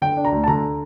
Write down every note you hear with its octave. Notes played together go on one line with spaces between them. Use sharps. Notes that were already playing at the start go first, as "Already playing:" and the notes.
D3 G5
D4
A#5
D2
A5
D3 A#5